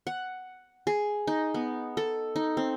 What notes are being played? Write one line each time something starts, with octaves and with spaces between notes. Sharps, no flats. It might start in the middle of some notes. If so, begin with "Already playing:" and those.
F#5
G#4
D#4
B3
A4
D#4
C4